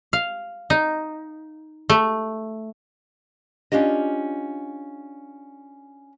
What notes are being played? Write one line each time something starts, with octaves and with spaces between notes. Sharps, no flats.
F5
D#4
A3
C#4 D4 F4 G4 D#5